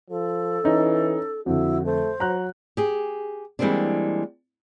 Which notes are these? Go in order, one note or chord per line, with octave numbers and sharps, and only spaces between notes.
F3 A4
E3 C#4 D#4
F2 D3 E4 F#4
A3 C5
F#3 A#5 F#6
G4 G#4
E3 G3 G#3 A#3 C4 D4